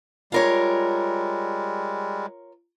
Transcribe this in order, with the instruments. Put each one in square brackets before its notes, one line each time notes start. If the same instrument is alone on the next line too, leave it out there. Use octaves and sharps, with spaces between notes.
[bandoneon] G3 G#3 [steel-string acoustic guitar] F4 A#4 C#5